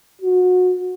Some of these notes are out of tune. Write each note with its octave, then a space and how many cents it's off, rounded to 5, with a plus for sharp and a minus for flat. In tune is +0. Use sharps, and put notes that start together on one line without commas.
F#4 -25